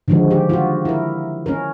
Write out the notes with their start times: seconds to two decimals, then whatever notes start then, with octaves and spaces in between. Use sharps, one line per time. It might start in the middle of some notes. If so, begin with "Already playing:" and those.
0.08 D3 D#3 F3 G#3 F#4
0.31 G4
0.49 F4 F#4
0.85 E4 A#4
1.46 C#4 A#4